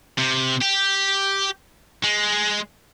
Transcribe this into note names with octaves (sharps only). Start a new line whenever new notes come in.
C3
G4
G#3